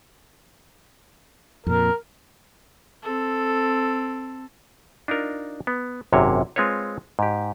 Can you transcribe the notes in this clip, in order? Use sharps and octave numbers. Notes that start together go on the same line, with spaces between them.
F2 A#2 A#4
C4 A4
D4 D#4 F4 A#4
B3
G#1 F#2 C3 A#3 C#5
G#3 C4 F4 B4 C#5
G#2 G4